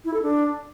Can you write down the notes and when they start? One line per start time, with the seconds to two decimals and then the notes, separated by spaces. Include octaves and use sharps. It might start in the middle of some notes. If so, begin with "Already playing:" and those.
0.05 E4
0.14 A4
0.22 D4